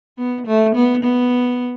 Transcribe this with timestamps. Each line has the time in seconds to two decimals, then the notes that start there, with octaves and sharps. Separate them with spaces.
0.18 B3
0.47 A3
0.75 B3
1.03 B3